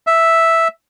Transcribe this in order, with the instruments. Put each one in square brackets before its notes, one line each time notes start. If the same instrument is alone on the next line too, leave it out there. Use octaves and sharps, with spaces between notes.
[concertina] E5